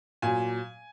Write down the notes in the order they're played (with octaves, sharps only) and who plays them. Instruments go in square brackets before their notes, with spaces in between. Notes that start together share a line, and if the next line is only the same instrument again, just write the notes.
[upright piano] A#2 F#3 G#5